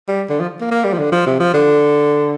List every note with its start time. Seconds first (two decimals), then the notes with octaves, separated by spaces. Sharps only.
0.08 G3
0.29 D3
0.40 F3
0.61 A#3
0.71 A#3
0.84 G3
0.93 F3
0.98 D3
1.12 F3
1.26 C3
1.40 F3
1.54 D3